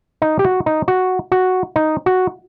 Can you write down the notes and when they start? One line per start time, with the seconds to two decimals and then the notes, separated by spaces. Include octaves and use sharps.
0.22 D#4
0.39 G4
0.44 F#4
0.66 D#4
0.88 F#4
1.32 F#4
1.76 D#4
2.06 F#4